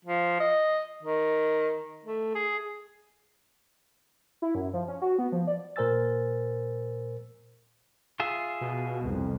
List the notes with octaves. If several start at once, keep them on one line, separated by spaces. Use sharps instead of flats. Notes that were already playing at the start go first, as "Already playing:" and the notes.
F3
D#5
D#3
A3
G#4
E4
F#2
F3
C#4
F#4
B3
F3
D5
A#2 A#4 C5 G#5 E6 A6
F4 G#4 E5
B2
C2 F2